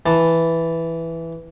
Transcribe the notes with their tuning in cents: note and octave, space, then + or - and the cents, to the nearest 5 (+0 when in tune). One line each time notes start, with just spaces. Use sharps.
E3 +0 A5 +0